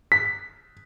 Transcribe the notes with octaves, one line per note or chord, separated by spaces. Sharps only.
B6